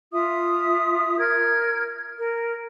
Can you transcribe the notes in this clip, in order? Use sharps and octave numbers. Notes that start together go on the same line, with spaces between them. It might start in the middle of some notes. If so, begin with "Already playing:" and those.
F4 E5 D#6
A#4 F6 G#6
A#4